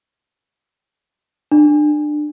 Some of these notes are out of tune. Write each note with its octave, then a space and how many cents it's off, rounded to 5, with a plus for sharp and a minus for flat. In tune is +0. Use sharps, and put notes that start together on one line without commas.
D4 +30